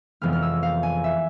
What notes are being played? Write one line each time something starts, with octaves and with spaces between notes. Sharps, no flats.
F1 F2 E3 G#3 B3 F6
F6
E6
F5
G#5
E5